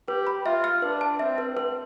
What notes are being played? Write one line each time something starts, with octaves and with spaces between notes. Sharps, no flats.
G4 B4
B5
F4 E5
F6
D4 B4
A5
C4 E5
B4
B4